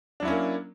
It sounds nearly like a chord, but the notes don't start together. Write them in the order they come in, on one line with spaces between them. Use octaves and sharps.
D4 F#3 E4 C#4 A#3